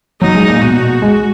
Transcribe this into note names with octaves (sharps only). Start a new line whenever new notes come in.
F#3 D#4
G#3
A#2
B2 F#4
G#3